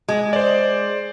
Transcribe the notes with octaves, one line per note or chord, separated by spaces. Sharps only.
G#3
C5 D5